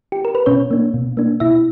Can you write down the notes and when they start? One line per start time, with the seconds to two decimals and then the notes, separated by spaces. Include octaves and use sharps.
0.12 G4
0.25 A#4
0.35 B4
0.46 B2 C#4 C#5
0.71 A#3 D4
0.94 B2
1.17 A#3 D4
1.40 B2 E4 E5